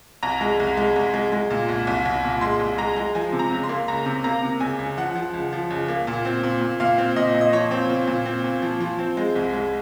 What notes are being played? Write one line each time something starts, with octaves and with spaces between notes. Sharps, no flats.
C2 A#5
G#3
C2
G#3
C2
G#3
G#3
A#2
C2
C2
C2
A#2
G#3 C6
C2
G#3 A#5
G#3
F3 G#5
C3
A#5
C#2
C6
A#3
C#2 A#5
C3
A#3 A#5
C3
C#2 G#5
C#2
F3 F#5
F3
C#2
F3
C#2
A#3
A#2
C4
A#2
A#2
A#2 F5
C4
A#2 D#5
A#2
D#5
F3 C#5
C4
A#2
A#2
C4
A#2
F3
F3
C4
G#3
C2
G#3